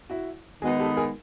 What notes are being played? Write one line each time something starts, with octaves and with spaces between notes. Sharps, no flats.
E4 F#4
D#3 G#3 B3 D#4 F#4 G#4
G4 A4
G#4 A#4